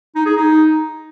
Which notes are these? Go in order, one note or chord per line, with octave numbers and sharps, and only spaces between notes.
D#4
G#4
D#4